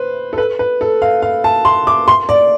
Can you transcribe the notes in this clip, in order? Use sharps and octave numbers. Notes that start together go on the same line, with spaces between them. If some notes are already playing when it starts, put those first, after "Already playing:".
Already playing: B4 C5
A4
B4
B4
A4
F5
F5
A5
C6
D6
C6
D5